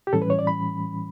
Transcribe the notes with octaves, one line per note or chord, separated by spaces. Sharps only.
G4
A2 E3 G3 C#4 A4
B4
C#5
D5
B5